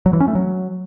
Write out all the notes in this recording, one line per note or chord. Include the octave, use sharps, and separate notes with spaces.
F#3
E3
C#4
A3
F#3